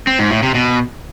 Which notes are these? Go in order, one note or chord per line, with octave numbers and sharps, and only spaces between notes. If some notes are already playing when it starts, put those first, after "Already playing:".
C4
G#2
A2
C3
B2